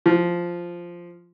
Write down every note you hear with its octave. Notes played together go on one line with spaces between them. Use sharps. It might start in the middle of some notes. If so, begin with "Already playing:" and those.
F3